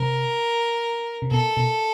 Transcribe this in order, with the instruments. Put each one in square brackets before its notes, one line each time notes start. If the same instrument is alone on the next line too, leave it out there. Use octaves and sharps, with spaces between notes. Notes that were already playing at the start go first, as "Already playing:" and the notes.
Already playing: [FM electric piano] C3 [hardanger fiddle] A#4
[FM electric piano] C3
[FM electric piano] B2 [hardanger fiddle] A4
[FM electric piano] B2